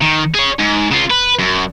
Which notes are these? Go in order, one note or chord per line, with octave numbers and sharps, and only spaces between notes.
D#3
G#4 C#5
G#2
C#3 F4
B4
F#2